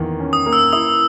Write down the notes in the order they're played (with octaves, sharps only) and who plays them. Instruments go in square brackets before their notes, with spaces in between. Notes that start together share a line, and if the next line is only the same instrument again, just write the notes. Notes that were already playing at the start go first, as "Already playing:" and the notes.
Already playing: [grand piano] E2 D#3 A#3
C#4
[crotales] D#6
[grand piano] A#3
[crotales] E6
[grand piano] E4 [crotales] D#6